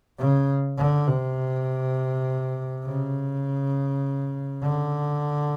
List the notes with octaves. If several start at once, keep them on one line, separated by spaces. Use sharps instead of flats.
C#3
D3
C3
C#3
D3